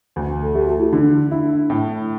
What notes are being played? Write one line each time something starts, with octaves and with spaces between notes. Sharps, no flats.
D2
A4
A3 G4
F#4
E4
D3 D4
D4 E4
A2